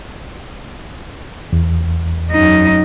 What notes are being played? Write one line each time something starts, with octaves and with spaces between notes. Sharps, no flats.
E2
F#2 D#4